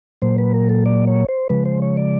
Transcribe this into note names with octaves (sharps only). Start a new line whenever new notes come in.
A#2 F#3 A#3 C5
B4
A#4
A4
D5
C#5
C5
C#3 F3 G#3 B4
C5
C#5
D5